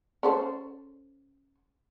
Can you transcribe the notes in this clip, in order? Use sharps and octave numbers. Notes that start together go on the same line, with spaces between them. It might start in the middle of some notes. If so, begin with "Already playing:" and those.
C#4 A4 C5